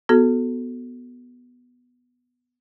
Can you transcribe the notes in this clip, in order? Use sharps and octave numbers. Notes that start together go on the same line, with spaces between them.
B3 F#4 A4